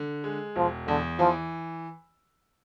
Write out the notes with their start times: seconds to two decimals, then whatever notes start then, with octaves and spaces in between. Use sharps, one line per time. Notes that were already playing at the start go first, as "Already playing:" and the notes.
Already playing: D3
0.24 G#3
0.56 E1 F3
0.87 E2 D3
1.19 E3 F3